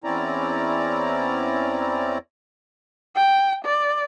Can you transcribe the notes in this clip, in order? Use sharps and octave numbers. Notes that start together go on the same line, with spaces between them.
E2 C4 C#4 E4 D5 A#5
G5
D5